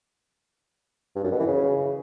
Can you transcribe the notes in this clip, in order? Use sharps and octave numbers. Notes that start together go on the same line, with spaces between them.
G2
F#2
B2
E3
C#3